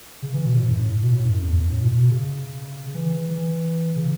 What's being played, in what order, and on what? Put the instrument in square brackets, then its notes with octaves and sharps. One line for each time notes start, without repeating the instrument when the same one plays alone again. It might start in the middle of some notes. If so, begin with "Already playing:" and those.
[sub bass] C#3
E3
B2
A2
F#2
A2
B2
A2
F#2
E2
F#2
A2
B2
B2
C#3
E3
E3
C#3